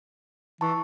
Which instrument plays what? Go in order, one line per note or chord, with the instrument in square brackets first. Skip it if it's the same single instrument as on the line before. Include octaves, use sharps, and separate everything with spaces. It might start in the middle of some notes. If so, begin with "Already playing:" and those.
[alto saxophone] E3 [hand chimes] A5 C#6